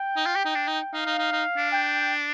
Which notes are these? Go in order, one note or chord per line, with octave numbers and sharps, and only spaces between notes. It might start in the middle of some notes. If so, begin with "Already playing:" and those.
Already playing: G5
D#4
F4
G4
D#4
D4
D#4
D#4 F5
D#4
D#4
D#4
D4
G5